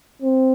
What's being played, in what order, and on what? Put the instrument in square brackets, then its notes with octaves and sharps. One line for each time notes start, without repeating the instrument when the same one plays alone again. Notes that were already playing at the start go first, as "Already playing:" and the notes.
[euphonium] C4